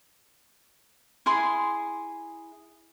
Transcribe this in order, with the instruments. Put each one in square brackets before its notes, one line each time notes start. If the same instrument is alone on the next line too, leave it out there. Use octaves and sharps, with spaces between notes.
[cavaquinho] E4 G#4 C6